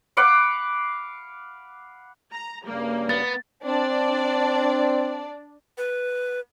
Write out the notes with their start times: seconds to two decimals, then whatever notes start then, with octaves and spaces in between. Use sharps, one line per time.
0.17 F5 F#5 B5 D6
2.33 A#5
2.66 G2 C#3 G3 A#3
3.09 B3 A6
3.65 C4 D4 D5
5.78 B4